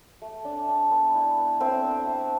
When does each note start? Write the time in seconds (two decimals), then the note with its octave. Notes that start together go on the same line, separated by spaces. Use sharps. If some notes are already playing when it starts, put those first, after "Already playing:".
0.22 A3
0.45 D4
0.68 D4
0.91 B3
1.15 E4
1.38 B3
1.60 A3 C4 C5
1.84 D4
2.07 A3